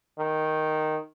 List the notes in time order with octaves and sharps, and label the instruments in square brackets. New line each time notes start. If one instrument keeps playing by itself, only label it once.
[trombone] D#3